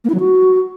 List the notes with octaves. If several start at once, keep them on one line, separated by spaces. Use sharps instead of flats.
A#3
E4
F#3
F#4